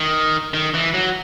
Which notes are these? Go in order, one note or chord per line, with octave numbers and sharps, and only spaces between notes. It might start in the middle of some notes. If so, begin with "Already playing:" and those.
Already playing: D#3
D#3
E3
F#3